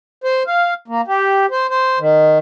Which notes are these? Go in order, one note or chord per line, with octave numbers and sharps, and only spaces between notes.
C5
F5
A#3
G4
C5
C5
D#3